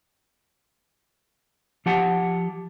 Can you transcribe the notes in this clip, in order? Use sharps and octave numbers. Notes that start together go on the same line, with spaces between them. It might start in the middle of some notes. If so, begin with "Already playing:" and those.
F3 G4 F#5 A5